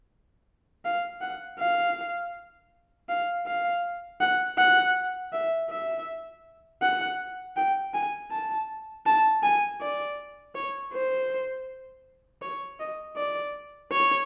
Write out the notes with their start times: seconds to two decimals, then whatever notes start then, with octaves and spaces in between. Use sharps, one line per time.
0.85 F5
1.22 F#5
1.59 F5
3.09 F5
3.46 F5
4.21 F#5
4.58 F#5
5.33 E5
5.70 E5
6.82 F#5
7.57 G5
7.94 G#5
8.31 A5
9.06 A5
9.43 G#5
9.81 D5
10.55 C#5
10.93 C5
12.42 C#5
12.80 D#5
13.17 D5
13.92 C#5